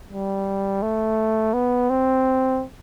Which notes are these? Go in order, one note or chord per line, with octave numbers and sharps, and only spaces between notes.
G3
A3
B3
C4